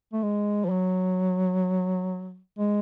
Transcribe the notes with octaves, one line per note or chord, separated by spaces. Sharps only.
A3
G#3
F3
F#3
G#3